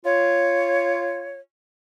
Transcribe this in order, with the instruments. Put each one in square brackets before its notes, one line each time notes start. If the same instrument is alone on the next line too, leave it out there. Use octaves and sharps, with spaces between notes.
[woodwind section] F4 C#5